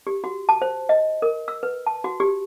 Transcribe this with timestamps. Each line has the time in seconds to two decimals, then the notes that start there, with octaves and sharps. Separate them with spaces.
0.07 G4
0.24 F#4
0.49 A5
0.62 C5
0.89 D#5
1.22 A#4
1.48 E6
1.63 B4
1.86 A5
2.04 F#4
2.20 G4